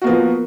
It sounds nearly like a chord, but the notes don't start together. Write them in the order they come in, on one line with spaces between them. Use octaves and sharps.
F#4 A#3 B3 F3